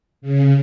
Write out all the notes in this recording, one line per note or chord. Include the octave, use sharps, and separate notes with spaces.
C#3